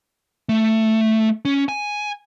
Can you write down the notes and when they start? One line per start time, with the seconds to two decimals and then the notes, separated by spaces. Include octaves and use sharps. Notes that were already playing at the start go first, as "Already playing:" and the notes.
0.49 A3
1.45 C#4
1.69 G#5